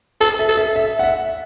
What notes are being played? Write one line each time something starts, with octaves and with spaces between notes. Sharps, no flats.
A4 A5
E5
A4
E5
E5
F#5
E5